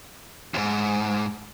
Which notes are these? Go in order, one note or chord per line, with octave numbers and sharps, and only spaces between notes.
D#2 G#2